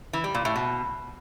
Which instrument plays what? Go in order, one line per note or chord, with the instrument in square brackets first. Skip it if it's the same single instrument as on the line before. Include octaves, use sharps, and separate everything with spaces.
[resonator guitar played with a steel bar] E3
G3
A#2
A2
B2